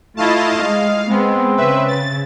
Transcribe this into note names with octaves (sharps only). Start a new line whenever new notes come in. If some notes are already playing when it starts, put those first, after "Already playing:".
A3 E4 F4 D#5 F5 A5
G#3 D#5 F5
G#3 B3 C4
C#3 B4 E5
A6